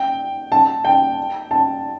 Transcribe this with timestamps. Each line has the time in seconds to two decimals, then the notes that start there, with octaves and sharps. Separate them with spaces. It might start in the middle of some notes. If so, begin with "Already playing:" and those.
Already playing: G5
0.52 A5
0.85 G5
1.51 A5